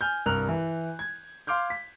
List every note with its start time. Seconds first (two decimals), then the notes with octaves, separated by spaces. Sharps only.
0.01 G#5 F6 G6
0.26 C2 G2 A#4 F6 F#6 F7
0.48 E3
0.99 G#6
1.47 F5 C6 D6 F6 G6
1.70 B6